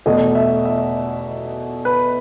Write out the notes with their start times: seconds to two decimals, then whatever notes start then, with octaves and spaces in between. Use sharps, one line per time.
0.06 E2 B2 A3 D#5
0.35 E5
0.65 E5
1.85 B4